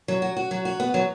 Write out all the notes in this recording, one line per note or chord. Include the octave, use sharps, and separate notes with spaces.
F#3
F#4
F#4
F#3
F#4
B3
F#3